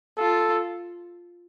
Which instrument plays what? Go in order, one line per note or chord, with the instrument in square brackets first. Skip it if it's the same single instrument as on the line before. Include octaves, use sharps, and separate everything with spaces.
[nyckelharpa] F4 [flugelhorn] A4